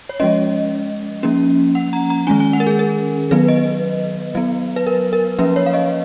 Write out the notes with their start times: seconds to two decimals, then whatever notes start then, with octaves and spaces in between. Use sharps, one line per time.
0.09 C#5
0.20 F3 G#3 C#4 D#5
1.23 F3 A#3 C#4
1.75 F#5
1.93 A#5
2.10 A#5
2.27 D#3 G#3 C#4 G#5
2.40 G#5
2.53 F#5
2.60 A#4
2.67 G#4
2.79 A#4
3.31 D#3 F#3 B3 B4
3.48 D#5
4.35 F#3 B3
4.76 B4
4.87 A#4
5.13 A#4
5.39 F3 A#3 C#4 B4
5.56 C#5
5.66 F5
5.74 D#5